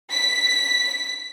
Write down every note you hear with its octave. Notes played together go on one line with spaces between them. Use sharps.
B6